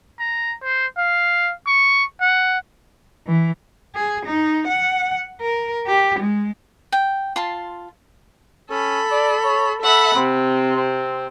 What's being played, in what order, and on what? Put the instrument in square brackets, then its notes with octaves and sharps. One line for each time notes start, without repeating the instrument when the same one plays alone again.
[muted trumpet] A#5
C5
F5
C#6
F#5
[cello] E3
G#4
D#4
F#5
A#4
G4
G#3
[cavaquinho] G5
F4 A5 C6
[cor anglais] C#4 [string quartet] A4 B5
[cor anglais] D5
C#5
[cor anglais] A4 [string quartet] E5 F#5 B5
[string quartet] C3 [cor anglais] C4
[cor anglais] C4